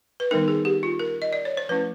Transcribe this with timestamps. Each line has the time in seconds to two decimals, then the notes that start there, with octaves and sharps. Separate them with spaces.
0.20 B4
0.31 D#3 G3 B3 D#4 A#4
0.48 G#4
0.65 G4
0.83 F4
0.99 A#4
1.22 D#5
1.33 D5
1.45 C#5
1.57 C5
1.69 F3 A3 C#4 E4 B4